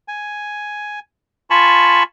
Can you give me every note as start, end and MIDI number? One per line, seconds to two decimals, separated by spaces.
0.08 0.99 80
1.50 2.03 65
1.50 2.03 80
1.50 2.03 81
1.50 2.03 83
1.50 2.03 85